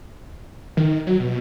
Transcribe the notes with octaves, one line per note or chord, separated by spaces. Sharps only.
D#3
F#3
B2